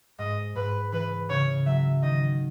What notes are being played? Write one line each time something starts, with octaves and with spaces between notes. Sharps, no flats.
G#2 D#5
G#2 B4
E3 B4
C#3 C#5
F#3 E5
D#3 D#5